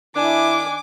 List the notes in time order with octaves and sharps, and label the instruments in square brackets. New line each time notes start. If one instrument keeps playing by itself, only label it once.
[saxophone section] D#3 D4 [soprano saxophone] E4 [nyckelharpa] G#5 [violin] D6